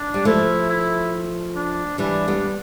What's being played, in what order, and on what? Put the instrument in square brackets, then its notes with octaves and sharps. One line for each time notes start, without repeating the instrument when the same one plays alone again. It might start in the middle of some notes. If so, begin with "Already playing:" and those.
Already playing: [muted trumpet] D4
[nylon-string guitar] G3
[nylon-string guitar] F3 A3 [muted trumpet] E4
[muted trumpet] E4
D4
[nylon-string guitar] E3 G3 [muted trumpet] D4
[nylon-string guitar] G3 B3